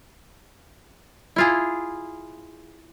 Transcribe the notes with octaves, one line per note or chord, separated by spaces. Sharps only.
E4 F4 G#4